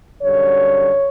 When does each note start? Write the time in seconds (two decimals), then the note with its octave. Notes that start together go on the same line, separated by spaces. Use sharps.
0.22 F#2 D3 G3 C#5